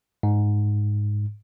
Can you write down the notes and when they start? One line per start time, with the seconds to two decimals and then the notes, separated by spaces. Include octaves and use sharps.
0.23 G#2